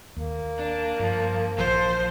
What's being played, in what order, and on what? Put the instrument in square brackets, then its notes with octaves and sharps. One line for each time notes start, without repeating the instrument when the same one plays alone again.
[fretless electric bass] D#2 [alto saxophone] A#3
[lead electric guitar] D4
[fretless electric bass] G2 [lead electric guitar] F3
[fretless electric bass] A#1 E3 [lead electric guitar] F3 [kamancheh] C5